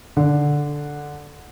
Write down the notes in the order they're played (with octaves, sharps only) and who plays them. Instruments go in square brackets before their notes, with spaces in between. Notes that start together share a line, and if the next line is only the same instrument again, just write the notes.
[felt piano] D3